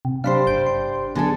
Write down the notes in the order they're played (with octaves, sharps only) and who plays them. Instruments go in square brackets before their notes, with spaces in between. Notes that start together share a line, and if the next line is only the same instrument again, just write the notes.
[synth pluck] C3
[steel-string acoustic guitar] D4 G4 C5 [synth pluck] F5 B5 C6
[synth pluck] G1 G6 D7
C6
[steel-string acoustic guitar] D3 G#4 A4 [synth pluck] B3